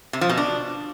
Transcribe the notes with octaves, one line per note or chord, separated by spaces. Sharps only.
C3
F3
B2
D4